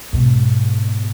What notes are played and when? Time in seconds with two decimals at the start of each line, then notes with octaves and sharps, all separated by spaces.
0.13 G#2 B2